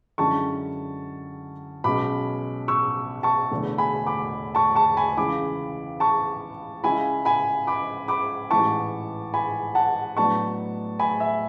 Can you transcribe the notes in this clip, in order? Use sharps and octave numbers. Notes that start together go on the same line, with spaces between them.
F#2 D3 G#3 C#4 E4 A5 C#6
B1 B2 G#3 C#4 B5 D6
C#6 E6
A5 C#6
E1 E2 D3 A3
G#5 B5
B5 D6
A5 C#6
A5 C#6
G#5 B5
C#2 C#3 E3 B5 D6
A5 C#6
C#2 C#3 G#3 C#4 E4 G#5 B5
G#5 B5
B5 D6
B5 D6
A1 G#2 E3 A5 C#6
G#5 B5
F#5 A5
A2 F#3 B3 D4 A5 C#6
G#5 B5
E5